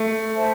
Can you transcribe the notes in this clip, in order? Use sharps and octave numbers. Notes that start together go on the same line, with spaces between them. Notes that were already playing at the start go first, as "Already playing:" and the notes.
Already playing: A3
C5 E5 A5